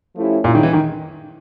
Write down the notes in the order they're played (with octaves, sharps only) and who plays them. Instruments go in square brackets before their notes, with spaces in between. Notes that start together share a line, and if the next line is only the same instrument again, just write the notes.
[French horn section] F3 A3 C#4 E4 G4
[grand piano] A#2 [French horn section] G#3 C#4 E4
[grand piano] D#3
E3
D#3